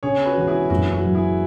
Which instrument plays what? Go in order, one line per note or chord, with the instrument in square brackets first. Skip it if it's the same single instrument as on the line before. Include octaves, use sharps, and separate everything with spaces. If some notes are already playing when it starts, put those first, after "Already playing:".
[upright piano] C#3 [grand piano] G#4 C#5
[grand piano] F#4 B4
[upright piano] E1 [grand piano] F#4
[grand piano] E4 G#4
[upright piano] F#1 [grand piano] F#4
[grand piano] F#4
[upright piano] F#3
[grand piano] E4 G#4